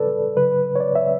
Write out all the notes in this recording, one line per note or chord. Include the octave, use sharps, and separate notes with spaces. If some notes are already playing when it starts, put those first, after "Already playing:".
Already playing: C#3 G3 A4 B4 D5
C#3 F#3 B4
C#5
D5
E5